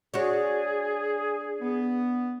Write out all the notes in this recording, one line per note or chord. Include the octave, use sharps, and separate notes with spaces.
D4 F#4 G#4 C#5
B3